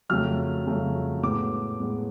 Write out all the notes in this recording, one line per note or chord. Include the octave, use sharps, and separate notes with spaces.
F2 C#3 F#3 A3 F6
F2 C#3 F#3 A3
A2 G#3 B3 D6
A2 G#3 B3